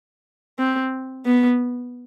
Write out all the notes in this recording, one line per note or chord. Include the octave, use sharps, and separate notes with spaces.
C4
B3